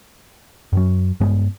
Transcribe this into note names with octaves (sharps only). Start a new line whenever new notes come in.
F#2 F#3
G2 G#3 B3